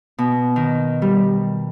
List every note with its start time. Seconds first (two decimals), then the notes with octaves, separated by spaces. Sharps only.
0.18 B2
0.56 D#3
1.02 G3